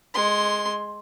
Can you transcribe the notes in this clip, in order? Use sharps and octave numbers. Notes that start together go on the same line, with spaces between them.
G#3 C6